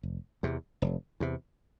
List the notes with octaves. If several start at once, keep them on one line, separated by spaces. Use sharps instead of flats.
F1
E2 C3
F1
E2 C3